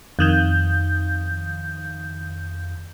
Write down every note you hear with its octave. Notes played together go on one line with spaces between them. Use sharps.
F2 D#3 G6